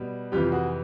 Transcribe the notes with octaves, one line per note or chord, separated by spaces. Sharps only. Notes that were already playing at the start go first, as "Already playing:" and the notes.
Already playing: B2 G3
F2 C3 E3 F4 G4
F#4 G#4